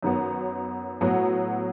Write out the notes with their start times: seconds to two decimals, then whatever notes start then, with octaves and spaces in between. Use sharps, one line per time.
0.03 F#2 D#3 F#3 B3
1.01 A2 F#3 B3 F#4